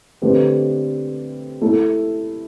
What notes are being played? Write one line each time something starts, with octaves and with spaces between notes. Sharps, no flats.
D3 A3 C4 G4 B4
A3 E4 A4